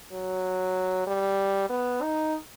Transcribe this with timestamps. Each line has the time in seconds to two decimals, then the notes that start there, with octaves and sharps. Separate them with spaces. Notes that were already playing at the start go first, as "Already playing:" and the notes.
0.12 F#3
1.07 G3
1.69 B3
2.02 D#4